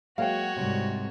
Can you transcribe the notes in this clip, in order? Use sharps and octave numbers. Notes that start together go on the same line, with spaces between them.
F#3 G#3 A#3 F#4 C#5 F5 G5
C2 G#2 C3